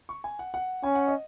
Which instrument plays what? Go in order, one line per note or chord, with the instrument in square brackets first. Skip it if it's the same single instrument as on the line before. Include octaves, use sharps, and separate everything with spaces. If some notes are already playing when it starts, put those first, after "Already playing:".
[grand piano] C#6
G#5
F#5
F#5
[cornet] C#4 [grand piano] G#5
[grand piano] F#5
D#5